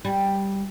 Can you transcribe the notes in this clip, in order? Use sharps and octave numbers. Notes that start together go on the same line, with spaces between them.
G3